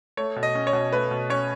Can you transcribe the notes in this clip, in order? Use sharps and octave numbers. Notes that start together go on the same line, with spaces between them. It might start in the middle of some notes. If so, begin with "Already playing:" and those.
A3 C#5
B2
D#5
C#4
C#5
B2
A3 B4
B2
C#4 C#5